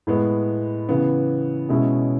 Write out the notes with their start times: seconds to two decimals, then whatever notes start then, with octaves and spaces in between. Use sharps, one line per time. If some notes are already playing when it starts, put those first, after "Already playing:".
0.07 A2 G#3 B3
0.89 C#3 E3 B3
1.69 B2 G#3 C#4 E4